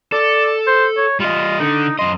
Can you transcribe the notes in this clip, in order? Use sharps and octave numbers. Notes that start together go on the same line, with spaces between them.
A4 D5
C5
C#5
G3 F4 D#5
D3 D#4
F#2 D#5 C6